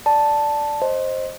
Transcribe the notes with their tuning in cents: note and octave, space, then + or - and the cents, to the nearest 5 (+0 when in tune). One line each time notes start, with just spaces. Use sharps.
D5 +0 A5 +0
C5 +15 D#5 -5